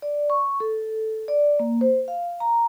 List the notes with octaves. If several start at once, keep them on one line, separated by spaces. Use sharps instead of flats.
D5
C#6
A4
D5
A#3
C5
F5
A#5